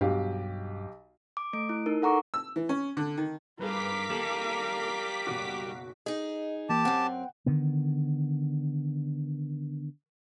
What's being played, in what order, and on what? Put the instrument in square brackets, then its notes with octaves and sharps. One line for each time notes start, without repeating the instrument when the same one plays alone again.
[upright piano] B1 G4 F5 [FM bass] G2
[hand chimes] D6
A3 D7
E4
D#4 A#4
A4 F#5 A#5 C#6 D6
[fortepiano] E6
E3
C#4
D3
D#3
[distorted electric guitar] G2 [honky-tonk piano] G#4 B4 [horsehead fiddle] A#4 F5 [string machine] D6 B6
[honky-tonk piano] D#2 A4 E7 [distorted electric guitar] G3
[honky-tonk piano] F#1 B1 F#4
[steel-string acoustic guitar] D#4 G#4 [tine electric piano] D#5
[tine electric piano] E3 A#3 [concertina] G4 A5
[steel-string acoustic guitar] F#2 C4 [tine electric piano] F#5 G5
[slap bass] D3 D#3 B3